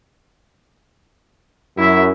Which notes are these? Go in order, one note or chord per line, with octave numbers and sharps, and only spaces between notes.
F#2 E4 E5